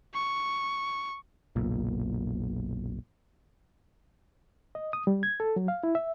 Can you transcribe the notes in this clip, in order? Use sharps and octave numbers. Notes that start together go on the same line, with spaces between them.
C#6
F#1 B1 A#2
D#5
D#6
G3
G#6
A4
F#3
F5
E4
E5